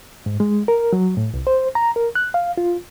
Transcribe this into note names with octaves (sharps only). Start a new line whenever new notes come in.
G#2
G#3
A#4
F#3
A2
C2
C5
A#5
A#4
F#6
F5
F4